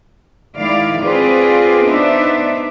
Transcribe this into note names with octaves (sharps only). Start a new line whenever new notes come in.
D#3 G#3 E4 D5 F5
C4 F4 G#4 B4 D5
B3 D4 D#4 C5 D5 E5